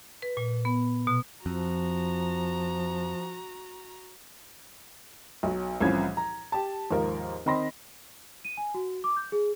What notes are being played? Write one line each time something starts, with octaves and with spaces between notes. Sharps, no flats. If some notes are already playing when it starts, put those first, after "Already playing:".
B4
A#2
B3
B2
F2 F3 F#4 A#5
B1 F#3
C2 A2 E3 F3 C#4 G#6
A#5
G4 A5
D#2 G#2 F3 A#4
D#3 C4 D#4 B5 C6 A#6
D#7
G#5
F#4
D6
G6
G#4